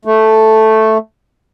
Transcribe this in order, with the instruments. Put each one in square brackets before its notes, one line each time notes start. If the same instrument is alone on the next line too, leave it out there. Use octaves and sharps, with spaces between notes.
[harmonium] A3